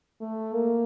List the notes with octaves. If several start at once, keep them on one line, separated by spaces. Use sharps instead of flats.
A3
A#3